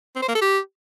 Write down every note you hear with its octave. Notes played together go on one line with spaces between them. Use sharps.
C4
C5
A#3
A4
G4